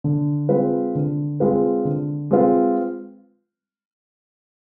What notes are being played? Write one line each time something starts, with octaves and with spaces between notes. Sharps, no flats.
D3
G#3 C4 F4 B4
D3
G#3 C4 F4 B4
D3
G#3 C4 F4 B4